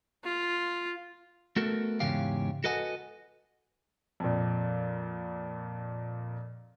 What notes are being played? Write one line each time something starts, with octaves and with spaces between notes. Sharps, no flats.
F4
A3 B3 F#4 A4 A#4
E2 G#2 C#3 C#4 G4 F5
F#4 A4 B4 D#5 F#5 G#5
F2 A#2